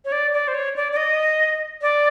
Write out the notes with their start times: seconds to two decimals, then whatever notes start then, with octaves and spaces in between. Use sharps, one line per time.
0.05 C#5
0.12 D5
0.33 D5
0.48 C5
0.54 C#5
0.76 D5
0.92 D5
0.96 D#5
1.82 D5